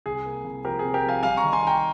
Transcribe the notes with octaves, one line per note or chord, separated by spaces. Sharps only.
C2 G#4
A#3
C2
F3 G4 A#4
G#4
C3
G4 A#4
F3 F5 G#5
G3 F5 G#5
A#5 C#6
D#3
G#5 C6
D#3 G5 A#5